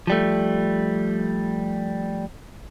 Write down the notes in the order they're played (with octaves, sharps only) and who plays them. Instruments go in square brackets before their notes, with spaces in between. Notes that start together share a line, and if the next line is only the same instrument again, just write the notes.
[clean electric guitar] F3 G3 A3